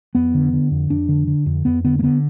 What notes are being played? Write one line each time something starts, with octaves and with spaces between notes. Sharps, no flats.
F2 B3
D3
D3
F2
F2 D4
D3
D3
F2
F2 B3
D3 B3
A#3
D3 B3